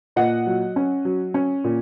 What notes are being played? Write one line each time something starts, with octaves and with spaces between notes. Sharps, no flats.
A#2 D#5 F#5
F#3
C#4
F#3
C#4
A#2